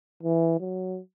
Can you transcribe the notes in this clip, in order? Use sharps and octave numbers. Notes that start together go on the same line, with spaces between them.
E3
F#3